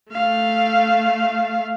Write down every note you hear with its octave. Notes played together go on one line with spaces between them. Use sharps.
A3 F5